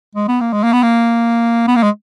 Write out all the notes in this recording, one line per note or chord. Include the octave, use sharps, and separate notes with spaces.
G#3
B3
A#3
G#3
A#3
B3
A#3
B3
A#3
G#3